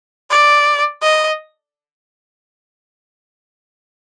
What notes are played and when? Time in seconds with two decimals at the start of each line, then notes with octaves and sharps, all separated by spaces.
0.31 D5
1.02 D#5